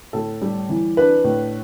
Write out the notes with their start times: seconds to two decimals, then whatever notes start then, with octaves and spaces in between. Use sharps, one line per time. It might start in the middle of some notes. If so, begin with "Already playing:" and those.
0.13 A2 A4
0.42 G3
0.69 E3
0.97 D4 B4
1.24 A2